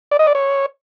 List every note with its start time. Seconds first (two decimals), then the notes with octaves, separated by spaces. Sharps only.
0.11 D5
0.19 D#5
0.27 D5
0.35 C#5